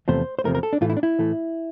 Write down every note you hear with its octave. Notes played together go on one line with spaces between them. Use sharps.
E2 C3 F3 A3 C5
C5
E2 C3 F3 A3 A#4
A#4
A4
D4
A2 E3 A3 F4
E4
D4
E4
A2 E3 A3